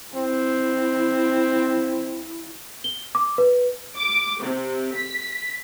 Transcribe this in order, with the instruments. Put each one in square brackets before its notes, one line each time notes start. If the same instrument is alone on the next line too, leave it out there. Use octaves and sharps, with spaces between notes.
[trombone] C4 [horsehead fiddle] E4
[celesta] G7
D6
B4
[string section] D6
C3
B6